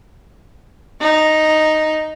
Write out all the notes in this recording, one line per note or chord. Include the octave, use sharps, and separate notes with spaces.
D#4